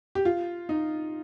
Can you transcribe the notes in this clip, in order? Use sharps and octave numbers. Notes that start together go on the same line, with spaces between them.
G4
F4
D#4